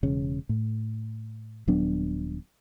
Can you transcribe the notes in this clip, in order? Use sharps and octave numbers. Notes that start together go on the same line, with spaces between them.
E1 C#3 C#4
A2
D#1 F#3 B3 D4